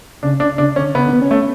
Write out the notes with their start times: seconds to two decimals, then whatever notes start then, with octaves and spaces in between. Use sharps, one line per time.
0.23 C#3 D4
0.40 D4
0.58 C#3 D4
0.76 D3 C#4
0.95 C#3 B3
1.04 D3
1.13 B3
1.21 C#4
1.31 A3